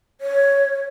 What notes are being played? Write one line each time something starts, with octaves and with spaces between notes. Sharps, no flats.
C#5